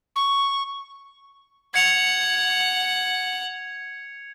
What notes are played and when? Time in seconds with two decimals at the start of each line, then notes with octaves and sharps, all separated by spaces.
0.16 C#6
1.74 F#5 G#6 C#7 F7